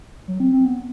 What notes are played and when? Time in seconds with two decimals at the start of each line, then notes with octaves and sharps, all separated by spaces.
0.28 F#3
0.40 C4
0.53 C4
0.65 B3